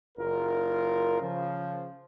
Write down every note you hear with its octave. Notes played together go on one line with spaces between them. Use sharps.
F#1 F4 A#4
C#3 F3